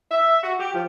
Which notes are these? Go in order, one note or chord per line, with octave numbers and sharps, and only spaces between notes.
E5
F#4
G4
F3